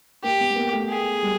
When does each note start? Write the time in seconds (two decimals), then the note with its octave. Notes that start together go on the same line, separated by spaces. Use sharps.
0.24 A#3 G4
0.40 B3
0.51 B3
0.56 A#3
0.73 A3
0.90 G#4
1.23 G3